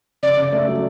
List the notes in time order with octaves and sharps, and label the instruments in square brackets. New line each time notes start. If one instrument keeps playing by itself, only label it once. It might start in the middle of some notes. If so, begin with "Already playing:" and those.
[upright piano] C#3 [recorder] D5
[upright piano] C#3
A3
F#3